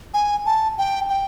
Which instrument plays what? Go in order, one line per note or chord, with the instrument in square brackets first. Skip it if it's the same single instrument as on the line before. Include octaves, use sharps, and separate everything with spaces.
[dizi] G#5
A5
G5
G5